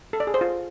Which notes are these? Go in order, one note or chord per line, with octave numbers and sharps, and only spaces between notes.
A4
D5
G#4
C5
F4